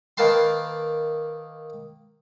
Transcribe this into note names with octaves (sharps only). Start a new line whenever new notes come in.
D#3 A#3 B4 A5 C6